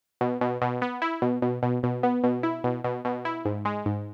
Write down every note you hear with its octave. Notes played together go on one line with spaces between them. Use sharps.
B2
B2
B2
B3
E4
B2
B2
B2
B2
B3
B2
E4
B2
B2
B2
E4
G#2
G#3
G#2